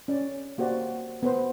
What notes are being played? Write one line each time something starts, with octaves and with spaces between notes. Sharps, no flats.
C#4 D5
A#3 F#4 G4 C5 D5
B3 B4 C5